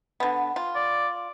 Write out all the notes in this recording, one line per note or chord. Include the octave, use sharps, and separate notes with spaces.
D3 B3
F4
D5